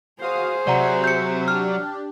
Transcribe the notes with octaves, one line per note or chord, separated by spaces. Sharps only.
F#4 G#4 C5 F5 D#6
C3 F#3 D5 E5 F#5 A#5
G6 C#7
D4 G4 F6